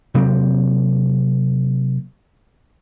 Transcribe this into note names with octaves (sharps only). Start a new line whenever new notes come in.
C3 F#3 A#3 C4